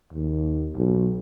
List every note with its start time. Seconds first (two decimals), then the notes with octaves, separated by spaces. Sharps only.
0.13 D#2
0.76 B1